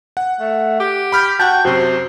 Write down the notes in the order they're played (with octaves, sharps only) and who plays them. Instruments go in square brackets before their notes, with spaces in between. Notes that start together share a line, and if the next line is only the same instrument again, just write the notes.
[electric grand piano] F#5
[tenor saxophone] A3
G4
[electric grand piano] B5 F6 G6
[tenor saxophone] F#4 [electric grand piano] G5 A5 [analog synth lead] G6
[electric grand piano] F#2 C3 [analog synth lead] F#4 [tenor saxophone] C5